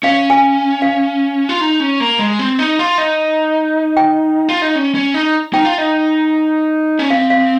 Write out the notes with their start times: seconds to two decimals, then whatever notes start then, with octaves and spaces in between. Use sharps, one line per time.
0.03 C#4 F5
0.30 G#5
0.82 F5
1.49 F4
1.61 D#4
1.80 C#4
2.00 A#3
2.19 G#3
2.39 C4
2.59 D#4
2.79 F4
2.98 D#4
3.97 G5
4.49 F4
4.62 D#4
4.75 C#4
4.95 C#4
5.14 D#4
5.53 D#4 G5
5.65 F4
5.78 D#4
6.99 C#4
7.11 C4 F5
7.30 F5